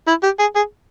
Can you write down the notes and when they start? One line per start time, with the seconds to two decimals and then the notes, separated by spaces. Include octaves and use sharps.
0.07 E4
0.23 G4
0.40 G#4
0.56 G#4